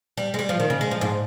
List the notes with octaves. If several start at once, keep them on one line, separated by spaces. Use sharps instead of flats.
G3
G#3
G3
F3
D#3
C#3
G#3
F3
G#2